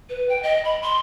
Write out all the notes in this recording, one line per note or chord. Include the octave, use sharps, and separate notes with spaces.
B4
G5
D#5
B5
C6